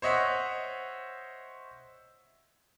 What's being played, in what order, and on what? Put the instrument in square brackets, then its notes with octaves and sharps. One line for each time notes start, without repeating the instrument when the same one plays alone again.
[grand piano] C5 C#5 D#5 E5 F#5